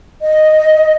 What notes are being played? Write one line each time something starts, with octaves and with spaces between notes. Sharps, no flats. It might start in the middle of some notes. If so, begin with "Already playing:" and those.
D#5